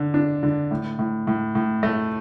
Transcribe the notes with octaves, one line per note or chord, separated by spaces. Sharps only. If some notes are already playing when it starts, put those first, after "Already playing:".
Already playing: D3
D4
D3
A2
A2
A2
A2
A3